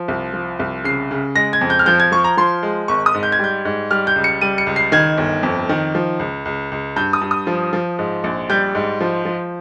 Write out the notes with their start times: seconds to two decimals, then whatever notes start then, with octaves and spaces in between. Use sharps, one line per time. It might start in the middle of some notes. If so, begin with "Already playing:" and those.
Already playing: F3
0.08 C2
0.34 F3
0.59 C2
0.84 C#3 C7
1.11 C#3
1.35 G#3 A#6
1.53 G#6
1.61 F2
1.70 G6
1.79 F6
1.86 F3 G6
2.00 G#6
2.12 F3 C#6
2.24 A#5
2.37 F3 C6
2.63 G#3
2.88 G#1 C#6
3.06 D#6
3.14 G#2
3.23 G6
3.32 G#6
3.39 G3 G6
3.65 G#2
3.91 G3 F6
4.07 G6
4.16 C#2
4.24 C#7
4.41 G3 D#7
4.58 C#7
4.67 C#2
4.76 C7
4.92 D#3 G#6
5.17 G1
5.43 F2
5.69 D#3
5.95 F3
6.19 C#2
6.45 C#2
6.72 C#2
6.96 G2 G6
7.13 D#6
7.21 G2
7.31 D#6
7.47 F3
7.73 F3
7.99 G#2
8.24 A#1
8.50 G3 G6
8.75 G#2
9.01 F3
9.25 F3